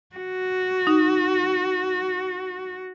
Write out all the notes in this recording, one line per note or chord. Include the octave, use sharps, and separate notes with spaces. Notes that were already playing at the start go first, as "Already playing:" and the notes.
F#4
D#4